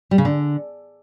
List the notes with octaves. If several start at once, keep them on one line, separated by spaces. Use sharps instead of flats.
G3
C#3
D3